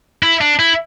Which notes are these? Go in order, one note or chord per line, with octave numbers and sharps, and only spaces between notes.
E4
D4
E4